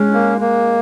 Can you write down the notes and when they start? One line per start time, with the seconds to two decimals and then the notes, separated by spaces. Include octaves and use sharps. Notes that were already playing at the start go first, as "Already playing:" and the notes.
Already playing: G#3 C#4
0.14 A#3
0.41 A#3